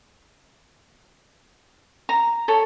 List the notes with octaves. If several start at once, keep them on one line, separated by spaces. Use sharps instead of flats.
A#5
A4 C#5